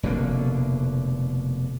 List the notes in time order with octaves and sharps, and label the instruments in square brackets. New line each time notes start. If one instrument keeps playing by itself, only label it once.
[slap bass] F1 B2 D3 A#3